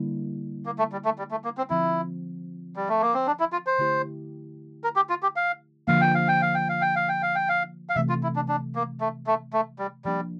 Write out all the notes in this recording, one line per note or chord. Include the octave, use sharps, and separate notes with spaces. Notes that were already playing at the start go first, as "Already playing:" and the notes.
Already playing: D3 G3 A#3 E4
A#3
A3
G3
A3
G3
A3
A#3
C4
D3 F3 C4 E4
G3
A3
A#3
C4
D4
E4
F4
C5
D3 A3 E4 G4
A#4
G4
F4
G4
F5
D3 F3 A#3 F5
G5
F5
G5
F5
G5
F5
G5
F5
G5
F5
G5
F5
F5
C3 E3 A3 E5
F4
E4
D4
D4
A#3
A3
A3
A3
G3
F3 G3 A#3 D4